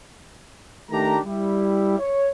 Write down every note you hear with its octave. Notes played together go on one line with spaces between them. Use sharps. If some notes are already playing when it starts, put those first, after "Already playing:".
D#3 A3 D4 G4 A5 A#5
G3 E4
C#5